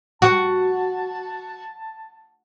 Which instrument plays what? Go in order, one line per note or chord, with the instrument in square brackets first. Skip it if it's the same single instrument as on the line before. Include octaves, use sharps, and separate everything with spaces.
[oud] F#4 [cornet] A5